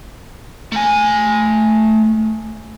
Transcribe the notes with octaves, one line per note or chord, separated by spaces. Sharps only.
A3 G#5